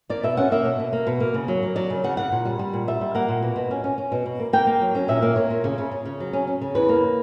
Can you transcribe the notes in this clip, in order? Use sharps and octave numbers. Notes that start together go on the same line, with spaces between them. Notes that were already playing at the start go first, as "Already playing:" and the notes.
A#3 D5
B2 E5
C#4 F#5
A#3 E5
B2
B2
A#3
B2
A#3
C#3
F#3
A#3
F#3 D5
C#3
C#3 F#5
C#3 F#5
A#2
G3
G3
A#2
G3 E5
G3
A#3 F#5
A#2
B2
B2
C#4
C#4
C#4
B2
B2
A#3
A#3 G5
A#3
F#3
C#4
A#2 E5
A#3
A#3 C#5
A#2
C#3
C#3
C#3
C#3
F#3
C#4
C#4
C#3
E2 B4
A#3